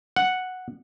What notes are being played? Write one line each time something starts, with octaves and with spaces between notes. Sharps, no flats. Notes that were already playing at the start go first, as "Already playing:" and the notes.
F#5